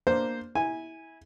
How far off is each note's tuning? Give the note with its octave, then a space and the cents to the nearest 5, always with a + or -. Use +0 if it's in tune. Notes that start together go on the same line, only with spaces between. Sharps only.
A#3 +0 D4 +0 C5 +0
E4 -20 G#5 -10